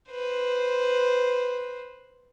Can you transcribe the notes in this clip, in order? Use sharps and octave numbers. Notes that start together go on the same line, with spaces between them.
B4 C5